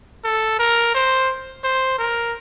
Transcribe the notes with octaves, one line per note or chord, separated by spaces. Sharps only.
A4
A#4
C5
C5
A#4